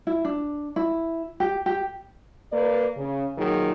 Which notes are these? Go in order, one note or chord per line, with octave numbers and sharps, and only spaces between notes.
E4
D4
E4
G4
G4
A#3 B4 D5
C#3
A#2 D#3 F#3 G#4